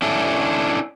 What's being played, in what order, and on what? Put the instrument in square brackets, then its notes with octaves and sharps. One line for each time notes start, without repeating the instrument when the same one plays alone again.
[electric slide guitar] C#4 D4 E4 A4